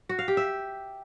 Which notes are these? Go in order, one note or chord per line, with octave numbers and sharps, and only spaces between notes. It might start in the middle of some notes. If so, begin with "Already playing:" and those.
F#4
F5
G4
E5